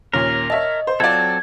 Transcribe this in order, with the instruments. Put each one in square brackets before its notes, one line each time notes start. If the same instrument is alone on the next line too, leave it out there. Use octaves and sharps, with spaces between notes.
[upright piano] D#2 A#2 C#4 [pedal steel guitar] A#4
[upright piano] C#5 E5 A5 [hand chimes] D#5
[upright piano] C5
[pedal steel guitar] F#3 C4 A4 [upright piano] F4 D5 [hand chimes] G#6